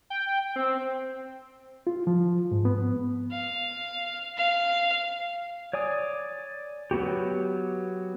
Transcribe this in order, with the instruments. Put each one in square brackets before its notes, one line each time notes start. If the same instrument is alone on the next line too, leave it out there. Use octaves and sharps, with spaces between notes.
[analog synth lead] G5
C4
[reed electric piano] F4
F3
G#2
B3
[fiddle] F5
F5
[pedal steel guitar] C#5 D5 G#5 D#6
F#3 B3 F#4 G4